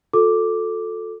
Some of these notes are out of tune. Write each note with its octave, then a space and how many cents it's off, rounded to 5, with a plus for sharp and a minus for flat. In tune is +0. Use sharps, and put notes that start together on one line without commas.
F4 +45 A4 +0 D6 +0